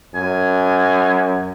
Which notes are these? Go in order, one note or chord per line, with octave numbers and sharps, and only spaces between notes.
F#2 G#5